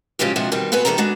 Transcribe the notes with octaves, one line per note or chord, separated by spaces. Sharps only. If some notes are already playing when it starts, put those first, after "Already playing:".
G#2 C#3 F3 F#3 C#4 G4
C3 F3 G#3 D4 F#4
B2 D#3 G3 C4
B3 C4 F#4 G#4 B4
E2 G2 D#3 G3 A4 A#5
B2 G#3 D4 F#4